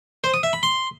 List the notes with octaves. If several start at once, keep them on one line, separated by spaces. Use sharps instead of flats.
C5
D#6
E5
B5
C6